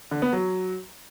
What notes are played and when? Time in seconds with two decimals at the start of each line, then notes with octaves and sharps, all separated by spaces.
0.11 D3
0.22 B3
0.33 F#3